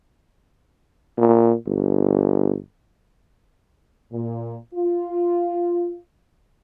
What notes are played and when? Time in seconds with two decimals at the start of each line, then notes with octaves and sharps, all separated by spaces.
1.18 A#2
1.67 G1
4.12 A#2
4.75 F4